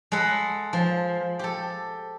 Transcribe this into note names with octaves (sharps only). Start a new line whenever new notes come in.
G#3 A4 F#5 B5
F3
G4 A4